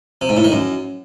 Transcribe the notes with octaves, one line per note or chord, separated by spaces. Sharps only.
C3
G#2
A2
D#3
F#2